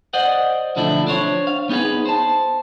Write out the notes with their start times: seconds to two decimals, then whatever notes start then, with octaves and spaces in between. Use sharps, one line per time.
0.13 C5 D5 D#5 F#5
0.76 B1 D3 F3 A3 D4 E4
1.07 D4 C5 C#5
1.47 F5
1.69 B3 D#4 F4 G#4 B4
2.06 C5 A5